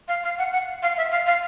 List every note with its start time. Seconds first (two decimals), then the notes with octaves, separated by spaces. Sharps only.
0.08 F5
0.24 F5
0.38 F#5
0.52 F#5
0.83 F5
0.97 E5
1.11 F5
1.26 F5